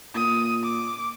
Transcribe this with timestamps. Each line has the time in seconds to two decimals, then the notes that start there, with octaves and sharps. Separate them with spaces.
0.15 A#2 D#6
0.63 D6